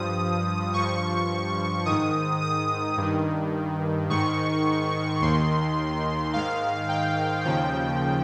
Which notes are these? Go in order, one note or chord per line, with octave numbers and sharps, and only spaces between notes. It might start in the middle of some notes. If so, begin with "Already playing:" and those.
Already playing: G2 F3 D#6
G2 F3 C#6
D#3 D#6
G#2
D#6
G2 D#3
G#2 D#3 C#6
D#2 D#3 C6
G#2 D#3 F5
G5
D#2 C#3 F3 G5